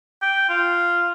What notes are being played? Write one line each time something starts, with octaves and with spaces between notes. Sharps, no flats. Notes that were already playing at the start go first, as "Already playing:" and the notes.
G5
F4